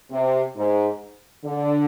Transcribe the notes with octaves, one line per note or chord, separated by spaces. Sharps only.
C3
G#2
D3